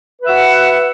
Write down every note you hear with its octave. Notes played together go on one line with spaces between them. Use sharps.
F#4 B4 E5 F#5